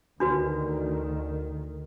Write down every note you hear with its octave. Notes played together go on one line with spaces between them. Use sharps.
D2 D#3 D4 F#4 B4